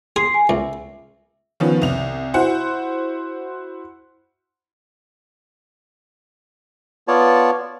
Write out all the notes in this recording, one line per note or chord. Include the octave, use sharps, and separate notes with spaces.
G#4 C6 C7
G#5
C#2 E5
D#3 F3 B3 C#4
C2 F7
E4 F#4 C5 F#5
B3 F4 C#5 D5 A5